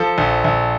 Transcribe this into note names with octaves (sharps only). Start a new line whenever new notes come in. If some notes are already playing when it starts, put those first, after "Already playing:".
Already playing: F3 A4
A#1
A#1